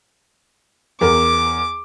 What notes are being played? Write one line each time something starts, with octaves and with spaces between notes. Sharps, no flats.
E2 A#4 D6